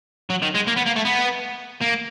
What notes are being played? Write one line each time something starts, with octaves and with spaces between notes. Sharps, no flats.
F#3
D#3
G#3
A#3
B3
A#3
A3
B3
A#3